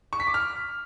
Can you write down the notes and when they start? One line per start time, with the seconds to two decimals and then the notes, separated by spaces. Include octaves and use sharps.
0.13 C#6
0.20 B6
0.27 D6
0.34 F6